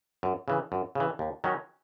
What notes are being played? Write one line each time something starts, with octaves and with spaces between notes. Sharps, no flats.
F#2
C#3 E3
F#2
C#3 E3
D#2
D#3 F#3 C#4